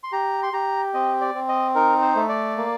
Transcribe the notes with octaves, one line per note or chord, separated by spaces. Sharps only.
C6
G4 A#5
C6
G4 A#5
C4 D#5
D5
C4
D#5
D#4 A#4
C5
A3
D5
A#3